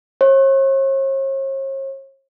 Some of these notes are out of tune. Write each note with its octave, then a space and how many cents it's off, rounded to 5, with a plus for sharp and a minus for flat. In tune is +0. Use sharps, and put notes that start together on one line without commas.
C#5 -45